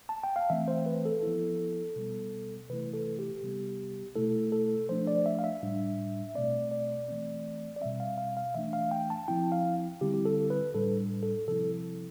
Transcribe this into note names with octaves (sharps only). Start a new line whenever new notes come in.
A5
G5
F5
E3 A3 C4 E5
C5
B4
A4
F3 B3 E4
B2 G3 B3
C3 E3 A3 E4 B4
A4
G4
C3 G3 B3
B2 A3 E4 A4
A4
F3 A3 D4 C5
D5
E5
F5
E5
A2 G3 D4
B2 A3 C4 D5
D5
E3 A3 C4
D5
B2 G3 C4 E5
F5
F5
F5
E3 A3 D4 E5
F5
G5
A5
F3 C4 E4 G5
F5
D3 G3 C4 E4 G4
G4
A4
B4
A2 G3 D4 A4
A4
C3 F3 C4 E4 A4